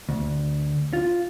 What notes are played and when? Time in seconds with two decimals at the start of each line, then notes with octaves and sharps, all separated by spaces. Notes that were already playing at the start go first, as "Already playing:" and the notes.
0.09 D2
0.93 F4